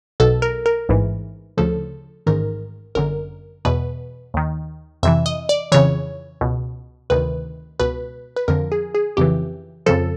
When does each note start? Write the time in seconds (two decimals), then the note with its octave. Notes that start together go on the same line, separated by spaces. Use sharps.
0.20 B1 B2 A4
0.42 A#4
0.66 A#4
0.89 A1 G#2 E3
1.57 D2 C#3 F3 A4
2.27 A1 G#2 D#3 A#4
2.95 G1 F#2 D3 A#4
3.65 E2 B2 B4
4.34 D#2 D#3
5.03 F2 C3 E3 E5
5.26 D#5
5.49 D5
5.72 F2 C#3 E3 C#5
6.41 C#2 B2
7.10 D2 C3 D#3 B4
7.80 C#2 B2 B4
8.36 B4
8.48 F2 D3 F3 A#4
8.72 G#4
8.95 G#4
9.17 F2 C#3 E3 G4
9.86 F2 C#3 F3 A4